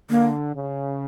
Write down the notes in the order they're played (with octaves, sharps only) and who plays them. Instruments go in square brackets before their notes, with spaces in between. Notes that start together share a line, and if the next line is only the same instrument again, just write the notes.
[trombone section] D3 [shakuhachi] A#3
[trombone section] C#3